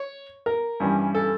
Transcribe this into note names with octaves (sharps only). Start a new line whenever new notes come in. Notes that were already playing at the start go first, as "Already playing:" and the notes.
Already playing: C#5
A#4
G2 E3 G3 C#4
A4